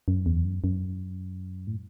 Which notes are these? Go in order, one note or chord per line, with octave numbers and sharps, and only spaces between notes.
F#2
E2
F#2
F#2
A2